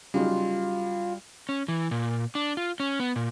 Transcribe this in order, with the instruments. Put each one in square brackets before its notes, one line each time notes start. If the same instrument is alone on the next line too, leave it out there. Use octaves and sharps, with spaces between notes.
[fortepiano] C#3 F#3 D#4 [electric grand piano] G3 [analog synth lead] F4
[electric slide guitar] C#4
E3
A#2
D4
F4
C#4
B3
A#2